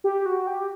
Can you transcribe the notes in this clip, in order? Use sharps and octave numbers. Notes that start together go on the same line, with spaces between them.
G4
F#4
G4